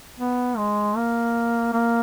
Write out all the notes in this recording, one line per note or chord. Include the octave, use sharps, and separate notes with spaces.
B3
G#3
A#3
A#3